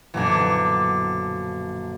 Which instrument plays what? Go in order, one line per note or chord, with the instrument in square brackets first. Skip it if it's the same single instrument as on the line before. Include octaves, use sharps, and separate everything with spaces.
[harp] A#1 F#2 B2 [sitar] D3 E3